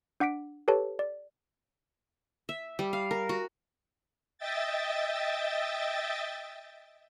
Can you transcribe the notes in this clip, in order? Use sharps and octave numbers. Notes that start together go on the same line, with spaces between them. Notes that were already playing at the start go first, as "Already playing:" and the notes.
D4 F#5 D6 B6 D7
G4 A4 B4 C#5 A5
D5
E5
G3
F5
A#4
F#4
D#5 E5 G5 A6